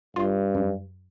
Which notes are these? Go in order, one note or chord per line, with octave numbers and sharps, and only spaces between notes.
G2 F4
F#2